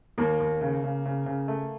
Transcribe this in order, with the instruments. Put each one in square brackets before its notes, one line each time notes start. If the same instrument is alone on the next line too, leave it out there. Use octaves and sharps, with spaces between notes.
[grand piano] D#2 [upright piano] A#3
[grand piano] D#2
C#3
C#3
C#3
C#3
A3